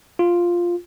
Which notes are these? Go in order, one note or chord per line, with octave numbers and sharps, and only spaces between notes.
F4